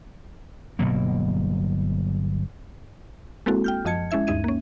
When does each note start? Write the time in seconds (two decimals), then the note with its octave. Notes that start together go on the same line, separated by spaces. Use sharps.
0.79 G1 B2 F#3 A#3
3.46 G#3 A#3 C4 E4 F#4 A4
3.64 G5 F6 G6
3.85 F#2 F3 D#5 A5 G#6 C#7
4.11 G#3 C#4 E4 E5 G#6
4.27 D2 G2 D#4 E5 G#6 D#7
4.44 A#3 C#4